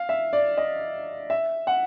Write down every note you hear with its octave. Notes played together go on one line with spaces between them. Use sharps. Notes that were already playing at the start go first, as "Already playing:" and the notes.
Already playing: F5
E5
D5
D#5
E5
F#5